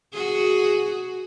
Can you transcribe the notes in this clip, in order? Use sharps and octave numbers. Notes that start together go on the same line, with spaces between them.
F#4 G#4